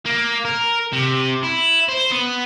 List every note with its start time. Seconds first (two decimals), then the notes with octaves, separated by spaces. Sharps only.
0.06 A#3
0.45 A#4
0.92 C3
1.43 E4
1.88 C5
2.11 B3